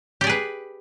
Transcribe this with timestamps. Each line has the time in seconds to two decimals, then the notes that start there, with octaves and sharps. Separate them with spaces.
0.21 G4
0.24 D5
0.27 G#4
0.30 B4